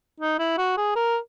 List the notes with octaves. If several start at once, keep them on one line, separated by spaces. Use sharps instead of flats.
D#4
E4
F#4
G#4
A#4